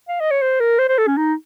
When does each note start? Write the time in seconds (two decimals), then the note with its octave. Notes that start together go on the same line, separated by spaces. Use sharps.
0.08 F5
0.20 D#5
0.31 C#5
0.42 C5
0.60 A#4
0.79 C5
0.89 C5
0.98 A4
1.07 C#4
1.17 D#4